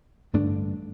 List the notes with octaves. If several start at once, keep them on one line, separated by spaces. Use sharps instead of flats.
A1 G2 D3 A3 D4